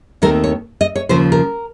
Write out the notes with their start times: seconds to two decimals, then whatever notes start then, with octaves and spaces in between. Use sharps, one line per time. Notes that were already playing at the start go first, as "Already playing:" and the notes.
0.22 D#2 D#3 A3 C4 A#4
0.44 C#5
0.81 D#5
0.96 C#5
1.09 D#2 C#3 F3 C5
1.32 A#4